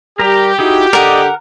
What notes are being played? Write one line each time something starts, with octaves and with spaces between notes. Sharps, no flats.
G3 G4 A#4 A#5
D#4 E4 F#4 G#4
D3 A#4 D5 D#5 F#5